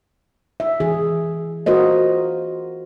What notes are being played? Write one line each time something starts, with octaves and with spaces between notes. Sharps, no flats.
E5
E3 G#4
F4 F#4 A#4 C5 D#5